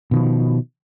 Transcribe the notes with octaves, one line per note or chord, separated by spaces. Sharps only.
B2 D#3 F3